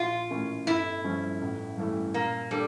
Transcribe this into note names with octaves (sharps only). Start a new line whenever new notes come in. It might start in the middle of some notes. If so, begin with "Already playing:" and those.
Already playing: A#1 F4
A2 E3 A#3 C#4
G1 E4
G2 F3 C#4 F4
A1
G2 E3 A3
A#2 A#3
G3 D4 A4